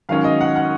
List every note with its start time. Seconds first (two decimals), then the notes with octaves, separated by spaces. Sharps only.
0.09 G#2 D#3 F#3 C#4 F5
0.24 D#5
0.41 F#5
0.56 F#5